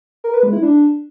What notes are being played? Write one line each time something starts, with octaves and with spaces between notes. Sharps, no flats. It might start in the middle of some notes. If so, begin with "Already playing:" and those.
A#4
B4
G#3
E4
D4